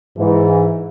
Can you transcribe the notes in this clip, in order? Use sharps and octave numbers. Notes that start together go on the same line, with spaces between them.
G#2 E3